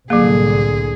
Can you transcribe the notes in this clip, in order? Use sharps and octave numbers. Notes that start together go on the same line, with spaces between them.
C2 A2 D3 F#3 A#3 G#4